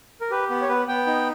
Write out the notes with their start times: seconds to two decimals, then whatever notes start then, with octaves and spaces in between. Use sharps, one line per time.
0.21 A#4
0.31 G4 B4
0.50 B3
0.62 C#5
0.69 B3 B4
0.88 B3 G5
1.07 D#4